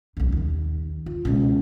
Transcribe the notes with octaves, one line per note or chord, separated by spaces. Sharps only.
C2 F#2
D#2
F4
C#2 B2